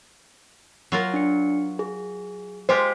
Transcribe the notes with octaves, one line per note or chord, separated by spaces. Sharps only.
F#3 F4 A#4
D4 C#7
G#4
G#3 F4 G4 C5 B6